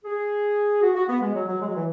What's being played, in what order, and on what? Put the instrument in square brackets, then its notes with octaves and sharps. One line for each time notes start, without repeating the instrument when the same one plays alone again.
[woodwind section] G#4
F#4
F#4
B3
G#3
F#3
F#3
G#3
F#3
E3